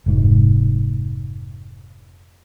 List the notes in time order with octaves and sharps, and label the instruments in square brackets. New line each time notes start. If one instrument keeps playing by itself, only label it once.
[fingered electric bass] F1 G#2